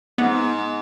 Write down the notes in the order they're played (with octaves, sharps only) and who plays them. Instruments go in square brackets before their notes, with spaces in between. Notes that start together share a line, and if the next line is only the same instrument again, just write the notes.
[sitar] G#2 [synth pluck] B3